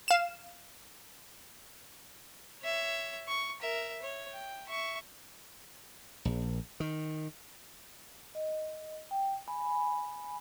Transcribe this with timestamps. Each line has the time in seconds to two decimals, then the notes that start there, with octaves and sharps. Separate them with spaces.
0.08 F5 E7
2.62 C#5 E5
3.28 C#6
3.62 A#4 E5
4.02 C#5
4.32 G5
4.67 E5 C#6
6.25 A#1
6.80 D#3
8.35 D#5
9.11 G5
9.48 G#5 B5